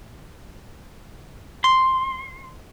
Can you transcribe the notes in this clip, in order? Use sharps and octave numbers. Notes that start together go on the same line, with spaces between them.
C6